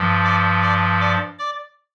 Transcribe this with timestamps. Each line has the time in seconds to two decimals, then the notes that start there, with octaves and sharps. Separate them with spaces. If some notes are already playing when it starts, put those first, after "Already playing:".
Already playing: G2 F3
0.24 D5 D6
0.62 D5 D6
1.01 D5 D6
1.39 D5 D6